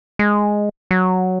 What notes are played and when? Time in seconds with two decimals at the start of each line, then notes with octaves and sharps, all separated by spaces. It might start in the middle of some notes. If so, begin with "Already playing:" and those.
0.19 G#3
0.91 F#3